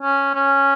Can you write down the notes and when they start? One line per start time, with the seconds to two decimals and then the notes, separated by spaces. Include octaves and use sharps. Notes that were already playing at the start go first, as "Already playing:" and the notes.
0.01 C#4
0.35 C#4